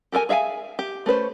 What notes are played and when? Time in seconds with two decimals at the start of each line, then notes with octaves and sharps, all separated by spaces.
0.12 G4 A4 A#4 G#5
0.29 G#4 E5 F5 G5 G#5
0.79 G4
1.06 A3 C#4 B4 C5